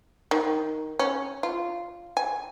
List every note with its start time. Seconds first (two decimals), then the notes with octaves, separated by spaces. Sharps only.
0.31 D#3
0.99 C#4
1.43 F4
2.17 G#5